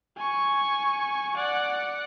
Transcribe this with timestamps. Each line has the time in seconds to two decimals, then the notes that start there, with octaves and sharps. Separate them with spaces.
0.17 G#5 C#6
1.36 D5 F#5